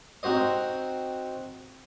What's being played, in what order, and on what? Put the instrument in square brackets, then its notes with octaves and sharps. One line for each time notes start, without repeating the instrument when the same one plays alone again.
[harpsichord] C4 D#4 F#4 C5 D#5